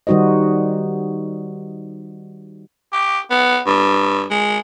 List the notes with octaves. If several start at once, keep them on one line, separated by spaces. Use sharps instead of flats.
D#3 G3 D#4 F#4 C5 D#5
G4
B3
G2
G#3